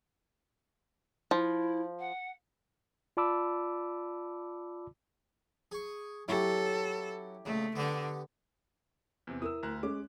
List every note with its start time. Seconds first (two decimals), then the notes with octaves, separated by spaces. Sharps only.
1.31 F3 E4
1.99 F#5
3.17 F4 D5 A5 B5 D6 E6
5.72 G#4 C#6
6.28 F#3 C#4 E4 G4 A4
7.45 C#2 A#2 A3
7.76 D3 B3 G4
9.27 E2 C3
9.42 E4 A#4 D#6 E6
9.63 D2 A#5 F#6
9.83 G#3 C#4 D6